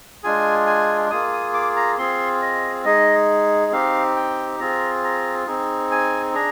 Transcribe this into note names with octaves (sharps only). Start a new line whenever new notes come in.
G#3 D4 F4 G#4 G#5
G#5
A#3 F4 G#4 D#6
D#6
D6
A#5
C4 F4 G#4 C6
D#5
G#3 D#4 G#4 D#5
C4 D#4 G4 F5
G5
C4 F4 G#4 A#5
A#5
C4 D#4 G#4
G#5
D4 G#4 A#5